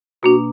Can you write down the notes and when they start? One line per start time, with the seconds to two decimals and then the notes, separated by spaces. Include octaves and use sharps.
0.23 B2 A#3 D4 F#4